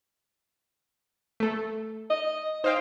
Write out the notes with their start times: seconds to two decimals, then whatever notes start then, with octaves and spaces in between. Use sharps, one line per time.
1.40 A3 A4
2.10 D#5
2.64 D#4 C5 F5 G5